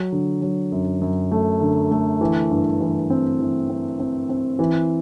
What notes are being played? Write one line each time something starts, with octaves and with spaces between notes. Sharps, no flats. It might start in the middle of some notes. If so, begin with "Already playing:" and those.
Already playing: F#3
D3
F#3
F#2
F#2
A3
D3
A3
E3
G2
E3
C4
E3
C4
C4
C4
E3